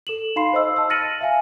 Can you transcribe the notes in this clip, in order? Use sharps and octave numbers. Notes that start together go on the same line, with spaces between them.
A4 E7 F#7
D#4 F5 B5 C6 C7
C5 D#5 E6
A5 E6
F6 A6 A#6 C#7 D#7 F#7
E5 F5 G#5